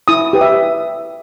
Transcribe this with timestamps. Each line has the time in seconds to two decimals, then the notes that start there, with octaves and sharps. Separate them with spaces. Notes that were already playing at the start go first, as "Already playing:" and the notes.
0.08 E4 D#6
0.33 G4 B4
0.41 E5